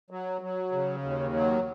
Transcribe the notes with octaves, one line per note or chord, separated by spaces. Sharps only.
F#3
F#3
C#3
D#2
F#3